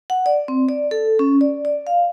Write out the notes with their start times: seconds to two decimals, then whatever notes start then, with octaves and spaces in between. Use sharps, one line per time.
0.10 F#5
0.26 D5
0.48 C4
0.69 D5
0.91 A4
1.19 C#4
1.41 D5
1.65 D5
1.87 F5